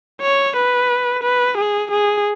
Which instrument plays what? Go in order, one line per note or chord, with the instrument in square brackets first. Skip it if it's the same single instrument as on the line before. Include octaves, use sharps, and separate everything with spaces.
[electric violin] C#5
B4
B4
G#4
G#4